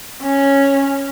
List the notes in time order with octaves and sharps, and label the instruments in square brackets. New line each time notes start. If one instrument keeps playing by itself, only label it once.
[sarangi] C#4